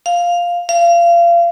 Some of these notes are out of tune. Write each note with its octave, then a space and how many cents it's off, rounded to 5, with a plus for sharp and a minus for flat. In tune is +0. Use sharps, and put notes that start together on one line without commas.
F5 +0
F5 -30